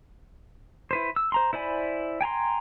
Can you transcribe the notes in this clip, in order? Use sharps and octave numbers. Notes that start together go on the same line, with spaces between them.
E4 B4 C5
E6
C5 A#5 C6
E4 C5 D5 G#5 B5
G5 G#5 A#5 C6